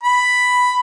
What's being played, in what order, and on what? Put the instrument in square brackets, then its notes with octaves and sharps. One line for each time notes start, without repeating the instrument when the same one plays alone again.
[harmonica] B5